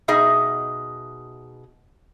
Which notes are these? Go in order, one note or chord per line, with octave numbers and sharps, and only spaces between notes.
B2 D#4 G#4 D#5 E5